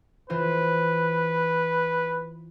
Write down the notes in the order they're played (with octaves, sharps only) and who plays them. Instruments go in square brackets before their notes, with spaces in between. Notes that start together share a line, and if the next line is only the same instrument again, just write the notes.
[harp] E3 F4 C5 [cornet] B4